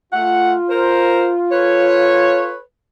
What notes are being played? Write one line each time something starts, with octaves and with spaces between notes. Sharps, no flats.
A3 F4 F#5
A#4 C5
A4 B4 C#5